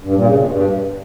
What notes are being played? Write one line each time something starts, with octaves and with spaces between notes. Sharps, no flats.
G2
A#2
C#3
B2
G2